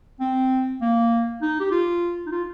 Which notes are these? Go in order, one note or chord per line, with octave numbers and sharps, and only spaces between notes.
C4
A#3
D#4
G4
F4
D#4
F4